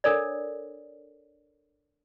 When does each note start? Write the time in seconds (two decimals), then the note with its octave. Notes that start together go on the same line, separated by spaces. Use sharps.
0.04 D4 A4 A#4 C#5 D5